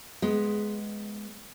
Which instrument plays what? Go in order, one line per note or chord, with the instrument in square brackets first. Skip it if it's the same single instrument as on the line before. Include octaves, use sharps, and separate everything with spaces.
[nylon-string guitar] G#3 B3